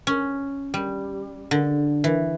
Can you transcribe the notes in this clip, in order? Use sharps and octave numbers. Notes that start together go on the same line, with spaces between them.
C#4
G3
D3
E3